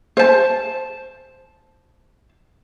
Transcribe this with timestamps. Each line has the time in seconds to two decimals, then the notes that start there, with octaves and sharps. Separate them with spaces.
0.17 C5 A5